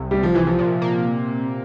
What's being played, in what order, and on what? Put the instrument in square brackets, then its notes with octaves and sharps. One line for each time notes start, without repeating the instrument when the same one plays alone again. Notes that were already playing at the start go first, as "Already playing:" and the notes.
Already playing: [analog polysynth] C2 C3
[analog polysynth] C2 [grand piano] G3
[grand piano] F3
[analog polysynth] C3 [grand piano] E3
[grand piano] F3
[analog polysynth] A#2
A#3